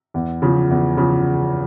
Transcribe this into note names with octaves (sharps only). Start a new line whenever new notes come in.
E2
C#3 F3
E2
C#3 F3